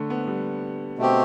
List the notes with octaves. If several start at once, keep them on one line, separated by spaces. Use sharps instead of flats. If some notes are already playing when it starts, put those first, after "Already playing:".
Already playing: D3 A3
B3
G3
B2 A3 C4 G4